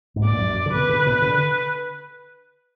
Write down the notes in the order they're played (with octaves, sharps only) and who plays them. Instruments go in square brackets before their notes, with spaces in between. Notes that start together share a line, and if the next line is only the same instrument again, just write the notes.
[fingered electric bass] G#2
[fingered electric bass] A#2 [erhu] D5
[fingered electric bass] F#2
F#2
D3
[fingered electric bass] B2 [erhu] B4
[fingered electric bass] D3
B2
D3